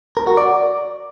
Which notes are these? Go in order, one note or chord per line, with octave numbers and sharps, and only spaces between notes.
A#4
F#4
D5